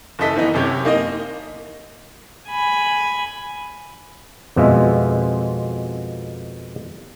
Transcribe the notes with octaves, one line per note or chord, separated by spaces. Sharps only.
F#1 E3 E4 A4 D#5 B6
D#3 E3 B3 D#4
F#2 C3 G4 C#5
A#3 D#4 D#5
G#5 B5
F2 B2 G#3 F4 E5